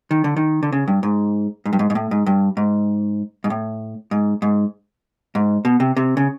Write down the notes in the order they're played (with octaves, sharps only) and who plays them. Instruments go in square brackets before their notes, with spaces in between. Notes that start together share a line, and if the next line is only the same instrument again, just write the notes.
[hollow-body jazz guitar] D#3
D3
D#3
D3
C#3
G2
G#2
G#2
G2
G#2
G#2
A2
G#2
G2
G#2
G#2
A2
G#2
G#2
G#2
B2
C3
C3
C#3